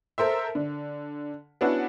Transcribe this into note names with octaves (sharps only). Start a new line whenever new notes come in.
A4 A#4 C5 E5
D3
B3 C#4 D4 E4 F#4 F#5